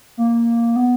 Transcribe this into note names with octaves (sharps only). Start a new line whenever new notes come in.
A#3
B3